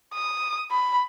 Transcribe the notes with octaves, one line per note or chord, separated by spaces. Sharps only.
D#6
B5